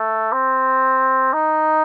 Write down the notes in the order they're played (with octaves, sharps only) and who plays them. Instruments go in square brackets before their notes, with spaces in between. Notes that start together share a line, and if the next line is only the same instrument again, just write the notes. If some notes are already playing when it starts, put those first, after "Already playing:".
Already playing: [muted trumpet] A3
C4
D#4